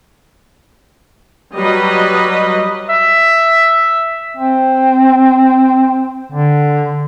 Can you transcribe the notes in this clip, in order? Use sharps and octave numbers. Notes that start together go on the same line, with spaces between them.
F#3 G3 B4 D#5
E5
C4
D3